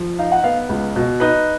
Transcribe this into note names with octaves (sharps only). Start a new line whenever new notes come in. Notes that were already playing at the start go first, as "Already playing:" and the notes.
Already playing: F3
D#4 F5
F#5
B3 F5
C#2
B2
D#4 B4